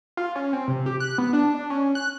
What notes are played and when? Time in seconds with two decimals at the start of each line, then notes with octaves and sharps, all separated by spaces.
0.17 F4
0.36 C#4
0.53 C4
0.68 C3
0.86 G4
1.00 F#6
1.18 B3
1.33 D4
1.55 D4
1.70 C#4
1.95 F#6